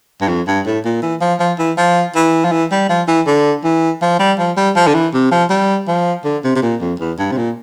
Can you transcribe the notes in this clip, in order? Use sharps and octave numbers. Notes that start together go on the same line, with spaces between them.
G2
F2
G2
A2
A#2
E3
F3
F3
E3
F3
E3
F3
E3
G3
F3
E3
D3
E3
F3
G3
F3
G3
F3
D3
E3
C3
F3
G3
F3
D3
C3
C3
A#2
F2
E2
G2
C3
A#2